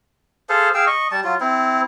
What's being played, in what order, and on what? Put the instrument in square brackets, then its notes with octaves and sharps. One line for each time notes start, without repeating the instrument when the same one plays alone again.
[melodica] G#4 A4 C5 F5
G#4 F5 G5 E6
D#5 C#6
G3 A5
F#3 F4
C4 E4